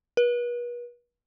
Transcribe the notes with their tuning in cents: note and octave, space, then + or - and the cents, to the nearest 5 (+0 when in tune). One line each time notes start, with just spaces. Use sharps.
B4 -40